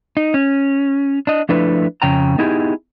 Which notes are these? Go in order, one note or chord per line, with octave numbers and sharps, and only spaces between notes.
D#4
C#4
D4 D#5
F3 A3 D4 E4 B4
F2 C#3 G5 A#5
B3 D#4 E4 G4 G#4